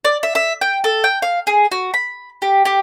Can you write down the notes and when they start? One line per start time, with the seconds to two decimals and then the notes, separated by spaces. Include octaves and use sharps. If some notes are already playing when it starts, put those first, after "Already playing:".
0.05 D5
0.23 E5
0.35 E5
0.61 G5
0.84 A4
1.04 G5
1.22 F5
1.47 G#4
1.72 F#4
1.94 B5
2.42 G4
2.65 G4